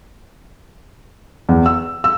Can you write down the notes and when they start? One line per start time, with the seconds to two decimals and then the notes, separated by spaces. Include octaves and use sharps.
1.49 E2
1.66 E6
2.04 E6